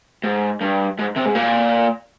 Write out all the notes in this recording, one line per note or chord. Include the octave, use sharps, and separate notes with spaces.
G#2
G2
G#2
C3
G#2
A#2